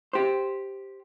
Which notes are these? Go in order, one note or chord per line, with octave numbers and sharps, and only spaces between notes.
G4 C5